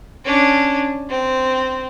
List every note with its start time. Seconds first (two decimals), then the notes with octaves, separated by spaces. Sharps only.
0.25 C#4 D4
1.09 C4